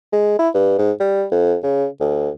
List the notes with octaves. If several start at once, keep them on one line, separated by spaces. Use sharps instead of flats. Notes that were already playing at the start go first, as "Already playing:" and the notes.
G#3
E4
G2
G#2
G3
F2
C#3
D2